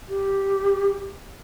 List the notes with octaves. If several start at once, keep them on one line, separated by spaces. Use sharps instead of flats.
G4